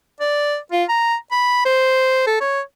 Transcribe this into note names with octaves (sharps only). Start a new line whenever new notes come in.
D5
F4
A#5
B5
C5
A4
C#5